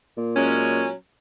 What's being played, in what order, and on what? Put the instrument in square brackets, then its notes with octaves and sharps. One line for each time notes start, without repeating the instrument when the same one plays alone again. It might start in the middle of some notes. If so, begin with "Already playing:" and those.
[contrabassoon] A#2
[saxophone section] F#3 G#3 C#4